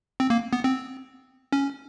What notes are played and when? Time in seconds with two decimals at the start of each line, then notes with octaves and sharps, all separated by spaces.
0.20 C4
0.30 A#3
0.53 B3
0.64 C4
1.52 C#4